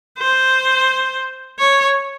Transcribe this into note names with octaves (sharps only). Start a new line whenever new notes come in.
C5
C#5